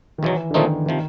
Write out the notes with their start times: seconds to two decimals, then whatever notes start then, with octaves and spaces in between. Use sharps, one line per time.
0.18 D#3
0.23 E2 B2 E3 F#3
0.51 D3
0.54 A#2 D#3 F3 A3 C4 D#4
0.86 C3 D#3 F3